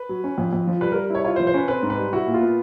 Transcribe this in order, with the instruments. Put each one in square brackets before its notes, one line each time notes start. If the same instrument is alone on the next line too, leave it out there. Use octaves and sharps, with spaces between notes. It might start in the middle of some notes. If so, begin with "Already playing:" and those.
Already playing: [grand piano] B4
[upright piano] F#3
C#4
F2
F2
F3
[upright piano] G3 [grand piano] B4
[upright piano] G3 [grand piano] A#4
[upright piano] E4 [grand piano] C#5
[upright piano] F4 [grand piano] C#5
[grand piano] C5
[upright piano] F3
[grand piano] C5
[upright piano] C#4 [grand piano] B4
[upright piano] C4 [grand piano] B4
[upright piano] G#2
[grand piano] B4
[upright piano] G3
[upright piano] E4 [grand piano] F#4
[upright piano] A#2
[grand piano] F4
[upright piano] B3